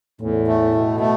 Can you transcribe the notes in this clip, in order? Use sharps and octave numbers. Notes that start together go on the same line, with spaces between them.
E2 A2
A3
B2
A3